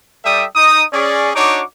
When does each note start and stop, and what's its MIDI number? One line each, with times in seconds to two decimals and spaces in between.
0.25 0.46 55
0.25 0.46 69
0.25 0.46 74
0.25 0.46 76
0.25 0.46 79
0.25 0.46 87
0.56 0.84 63
0.56 0.84 87
0.93 1.30 61
0.93 1.30 68
0.93 1.30 74
1.35 1.62 62
1.35 1.62 63
1.35 1.62 66
1.35 1.62 73
1.35 1.62 86